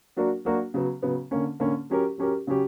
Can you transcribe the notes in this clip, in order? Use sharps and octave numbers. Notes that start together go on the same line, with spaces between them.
F#3 A#3 D4 F#4 A#4
F#3 A#3 D4 F#4 A#4
C#3 F#3 B3
C#3 F#3 B3
D3 A#3 C#4
D3 A#3 C#4
F#3 C#4 G4 A#4
F#3 C#4 G4 A#4
C#3 F#3 C#4 G4